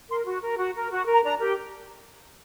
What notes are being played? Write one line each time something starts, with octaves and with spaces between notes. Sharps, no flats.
A#4 C6
F#4
A#4
F#4
A#4
F#4
A#4
A#5
D4 A#5
G4 A#4